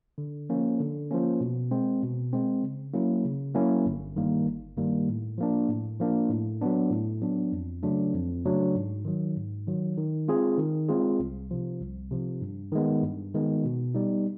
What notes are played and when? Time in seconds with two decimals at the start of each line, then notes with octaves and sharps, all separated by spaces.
0.18 D3
0.50 F3 A#3 C#4
0.80 D3
1.11 F3 A#3 C#4
1.40 B2
1.71 G#3 C4
2.03 B2
2.33 G#3 C4
2.63 C#3
2.94 F#3 A#3 C#4 E4
3.24 C#3
3.54 F#3 A#3 C#4 E4
3.86 G1
4.16 G2 D#3 G3 A#3
4.46 G1
4.77 G2 D#3 G3 A#3
5.08 A2
5.38 F3 A#3 D4
5.69 A2
6.00 F3 A#3 D4
6.30 A2
6.61 F#3 B3 D4
6.91 A2
7.21 F#3 B3 D4
7.52 F2
7.83 C#3 F#3 A3 D4
8.14 F2
8.45 C#3 F#3 A3 D4
8.75 G#2
9.05 D#3 F#3
9.37 G#2
9.67 D#3 F#3
9.97 D#3
10.28 G#3 C4 F4 G#4
10.58 D#3
10.89 G#3 C4 F4 G#4
11.20 C2
11.51 C3 F3
11.80 C2
12.11 C3 F3
12.41 G2
12.72 D#3 G#3 B3
13.03 G2
13.34 D#3 G#3 B3
13.65 B2
13.95 G3 B3 D#4